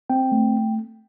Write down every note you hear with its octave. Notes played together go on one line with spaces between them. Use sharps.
C4 G5
A3